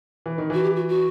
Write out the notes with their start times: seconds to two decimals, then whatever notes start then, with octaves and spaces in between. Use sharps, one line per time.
0.26 E3
0.38 D#3
0.50 E3 F#4
0.63 G4
0.76 F#4
0.89 F#4